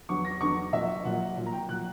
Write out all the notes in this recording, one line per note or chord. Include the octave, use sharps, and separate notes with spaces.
E2 D3 F#3 C#6
A#6
E2 D3 F#3 C#6
A#2 F#3 E5
A#2 F#3 F#5
A#2 F#3
A#5
G5
A#2 F#3 F#6